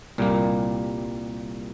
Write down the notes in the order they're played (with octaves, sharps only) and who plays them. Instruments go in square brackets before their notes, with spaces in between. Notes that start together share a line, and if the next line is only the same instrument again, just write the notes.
[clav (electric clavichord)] C2 A#2 G3 A#3